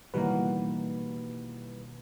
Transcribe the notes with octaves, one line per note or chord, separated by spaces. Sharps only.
B2 D#3 E3 G3 A#3 B4